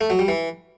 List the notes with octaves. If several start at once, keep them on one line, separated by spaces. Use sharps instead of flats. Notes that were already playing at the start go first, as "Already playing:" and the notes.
A3
F#3
G3
E3